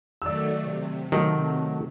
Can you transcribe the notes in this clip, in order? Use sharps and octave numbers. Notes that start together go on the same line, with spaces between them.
D#3 F#3 A3 D5 E6
C3
D#3 F#3 A3